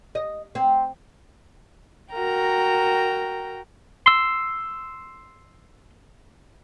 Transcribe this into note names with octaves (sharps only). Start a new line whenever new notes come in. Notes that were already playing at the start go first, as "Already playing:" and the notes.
D#5
C4
F#4 A#4 G5 A#5
C6 E6